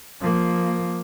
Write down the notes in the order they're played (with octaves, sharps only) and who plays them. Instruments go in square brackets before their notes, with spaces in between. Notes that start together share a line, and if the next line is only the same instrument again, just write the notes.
[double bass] F3 A#3